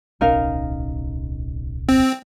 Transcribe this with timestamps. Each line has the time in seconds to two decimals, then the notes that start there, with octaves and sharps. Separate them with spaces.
0.21 D1 B1 C#4 D#4 A#4 F5
1.89 C4